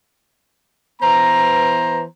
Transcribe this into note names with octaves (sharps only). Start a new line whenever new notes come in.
E3 B3 C5 A#5